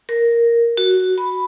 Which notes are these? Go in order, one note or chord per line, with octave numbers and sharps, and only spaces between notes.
A#4
F#4
B5